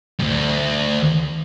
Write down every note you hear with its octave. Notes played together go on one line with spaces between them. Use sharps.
D2 G2